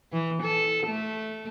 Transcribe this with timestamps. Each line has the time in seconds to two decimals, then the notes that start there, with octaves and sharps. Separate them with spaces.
0.12 E3
0.43 A4
0.86 A3